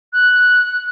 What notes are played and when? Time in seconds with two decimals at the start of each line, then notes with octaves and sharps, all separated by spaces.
0.13 F#6